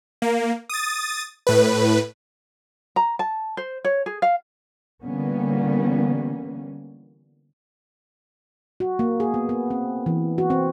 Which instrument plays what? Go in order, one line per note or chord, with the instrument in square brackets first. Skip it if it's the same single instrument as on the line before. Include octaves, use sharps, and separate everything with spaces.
[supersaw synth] A#3
D#6 A6
A2 B4
[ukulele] A#5
A5
C5
C#5
G#4
F5
[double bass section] D3 E3 G3 A#3 B3 C#4
[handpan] F#4
A#3
G#4
B3
B3
C4
E3
F#4
C4